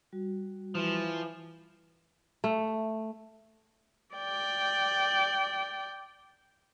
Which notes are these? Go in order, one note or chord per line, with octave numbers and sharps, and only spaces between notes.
G3 F#4
E3 F3
A3
D5 G5